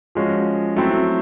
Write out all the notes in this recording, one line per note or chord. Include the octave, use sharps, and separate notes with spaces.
F3 G#3 C#4 F#4
F#3 A3 C4 E4